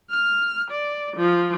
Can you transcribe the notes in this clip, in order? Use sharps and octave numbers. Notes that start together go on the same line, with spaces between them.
F6
D5
F3